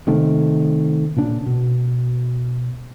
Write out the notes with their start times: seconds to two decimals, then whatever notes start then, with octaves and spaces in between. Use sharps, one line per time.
0.07 C3 D#3 A3
1.17 A#2 C#3 D4
1.46 B2